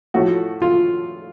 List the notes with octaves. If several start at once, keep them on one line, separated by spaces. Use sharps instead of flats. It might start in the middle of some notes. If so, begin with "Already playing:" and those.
A2 F3 A3 F#4
F4